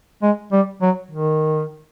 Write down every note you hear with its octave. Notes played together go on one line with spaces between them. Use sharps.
G#3
G3
F#3
D#3